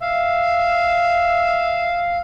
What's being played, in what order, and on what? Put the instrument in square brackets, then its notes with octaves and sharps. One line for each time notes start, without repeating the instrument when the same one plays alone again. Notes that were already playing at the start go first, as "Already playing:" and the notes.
[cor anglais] E5 [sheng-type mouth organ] F5